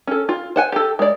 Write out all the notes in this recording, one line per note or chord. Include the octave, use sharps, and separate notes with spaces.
C#4 A4
F4
C5 F#5 G#5
G4 A4
G#3 D5